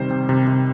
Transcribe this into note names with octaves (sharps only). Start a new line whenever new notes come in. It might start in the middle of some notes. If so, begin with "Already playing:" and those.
Already playing: C3 D#3 G3 C5
C3
C3
C3